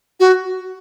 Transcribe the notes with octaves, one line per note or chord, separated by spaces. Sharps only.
F#4